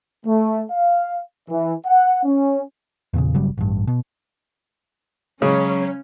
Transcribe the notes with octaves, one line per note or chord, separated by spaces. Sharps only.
A3
F5
E3
F#5
C#4
E2 A#2 C#3
G1 C#3 F#3 G3
A1 G2
B2
C#3 F#3 G#3 C#4